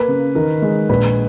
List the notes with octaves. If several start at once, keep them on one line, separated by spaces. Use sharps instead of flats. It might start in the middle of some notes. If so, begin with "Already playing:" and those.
Already playing: A#3 B4
C#3
D#3 A#4
G#3
A#1 B4